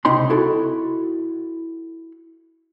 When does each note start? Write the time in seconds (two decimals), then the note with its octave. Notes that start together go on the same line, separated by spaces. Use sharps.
0.05 C#2 C3 C4 D#4 B5 C6
0.30 E4 F#4 A4